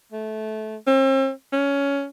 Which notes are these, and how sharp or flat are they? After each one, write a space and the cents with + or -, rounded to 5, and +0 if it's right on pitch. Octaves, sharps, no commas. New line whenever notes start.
A3 -20
C4 +45
C#4 +15